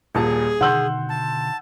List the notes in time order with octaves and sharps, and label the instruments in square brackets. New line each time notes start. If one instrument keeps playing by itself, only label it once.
[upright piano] D#1 A#2 A5 [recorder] G#4
[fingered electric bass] B2 D3 [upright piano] D#3 C6 F#7 [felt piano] F#5 E6 G6
[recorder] A5